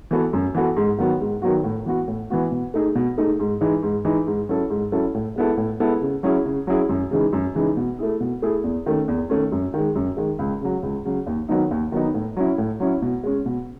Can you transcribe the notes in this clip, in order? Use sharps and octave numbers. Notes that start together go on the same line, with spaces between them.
E3 B3 F#4 A4
F#2
E3 B3 F#4 A4
G#2
D#3 F#3 B3 F#4
G#2
D#3 F#3 B3 F#4
A2
E3 B3 F#4
A2
E3 B3 F#4
B2
A3 D#4 G#4
B2
A3 D#4 G#4
G#2
E3 G#3 D#4
G#2
E3 G#3 D#4
G#2
F#3 C#4 E4 A4
G#2
F#3 C#4 E4 A4
A2
G#3 B3 E4 A4
A2
G#3 B3 E4 A4
C#3
F#3 C#4 E4 G#4
C#3
F#3 C#4 E4 G#4
F#2
C#3 E3 G#3 D#4
F#2
C#3 E3 G#3 D#4
B2
A3 E4 G#4
B2
A3 E4 G#4
E2
D#3 A3 C#4
E2
D#3 A3 C#4
F#2
D#3 G#3
F#2
D#3 G#3
C#2
C#3 F#3
C#2
C#3 F#3
D#2
D#3 F#3 B3 D#4
D#2
D#3 F#3 B3 D#4
A2
F#3 C#4 E4
A2
F#3 C#4 E4
B2
G#3 C#4
B2